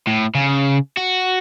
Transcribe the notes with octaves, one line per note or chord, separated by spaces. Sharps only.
A2
C#3
F#4